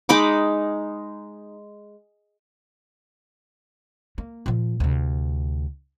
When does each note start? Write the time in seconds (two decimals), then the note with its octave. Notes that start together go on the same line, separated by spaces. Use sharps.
0.09 G#3 D#4 B5 D6
4.18 A#3
4.46 A#2 F3
4.80 D2 C3